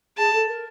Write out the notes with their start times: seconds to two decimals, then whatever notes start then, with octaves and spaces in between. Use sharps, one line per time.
0.17 G#4 A5
0.33 A4
0.48 A#4